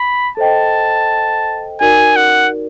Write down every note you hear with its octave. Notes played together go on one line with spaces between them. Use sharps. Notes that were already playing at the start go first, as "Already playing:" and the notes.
Already playing: B5
A4 C5 D#5 G5 A5
D#4 F#4 A#4 D5 G#5
F#5